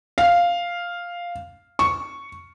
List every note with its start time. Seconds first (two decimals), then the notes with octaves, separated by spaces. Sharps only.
0.18 F5
1.79 C#6